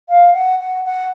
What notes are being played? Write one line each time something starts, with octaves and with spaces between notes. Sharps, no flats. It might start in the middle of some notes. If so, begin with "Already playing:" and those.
F5
F#5
F#5
F#5